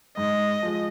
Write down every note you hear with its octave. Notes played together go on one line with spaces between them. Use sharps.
G#2 D#5
F3 G#3